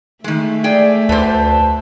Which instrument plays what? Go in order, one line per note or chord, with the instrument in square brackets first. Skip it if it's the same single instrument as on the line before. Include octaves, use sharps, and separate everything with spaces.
[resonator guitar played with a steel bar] D#3 G#3 [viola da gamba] A3
[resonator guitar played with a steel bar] G#4 G5 [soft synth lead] D5
[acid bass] D2 [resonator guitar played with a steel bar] B4 C5 [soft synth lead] A5